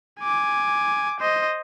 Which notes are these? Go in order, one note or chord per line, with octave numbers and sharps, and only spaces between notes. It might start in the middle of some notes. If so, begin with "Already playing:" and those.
G#5 D6
C5 D#5